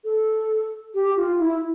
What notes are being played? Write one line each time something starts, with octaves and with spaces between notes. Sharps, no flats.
A4
G4
F4
E4